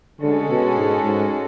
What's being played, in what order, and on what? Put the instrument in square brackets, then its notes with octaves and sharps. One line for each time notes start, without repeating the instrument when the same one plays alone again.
[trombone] D3 [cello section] G#3 C#4 F#4 A4
[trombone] B2
G#2
G#2